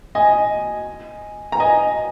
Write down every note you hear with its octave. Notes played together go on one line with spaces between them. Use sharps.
D#5 G#5
A#5
D#5 G#5